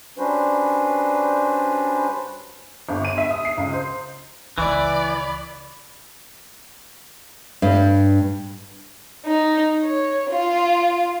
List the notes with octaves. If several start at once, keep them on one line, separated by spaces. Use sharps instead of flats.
G3 C#4 D4 F#4 B4 C5
G1
D#7
E5
D#6
C7
C#2
C5
C#2 E3 D5 B5
G2
D#4
C#5
F4